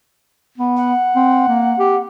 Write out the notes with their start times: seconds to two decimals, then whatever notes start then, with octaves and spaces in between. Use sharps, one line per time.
0.58 B3
0.77 F#5
1.16 C4
1.48 A#3
1.79 G4